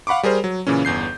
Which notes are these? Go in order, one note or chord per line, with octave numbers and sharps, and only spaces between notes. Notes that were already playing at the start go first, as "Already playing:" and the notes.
F5 F#5 B5 C#6 D6
G3 G#4 A#4 C5
F#3
A#2 C#3 E3 C#4
G1 E2 G6 C7